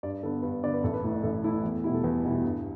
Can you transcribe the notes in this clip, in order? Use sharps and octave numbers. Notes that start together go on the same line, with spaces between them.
G2 D5
D3 B3 A4
G2 B4
D3 B3 D5
B4
A1 A4
B4
A2 A3 E4
A1 A4
A2 A3 E4
E2
B2 G3 E4
A4
E2 B4
B2 G3 E4
G2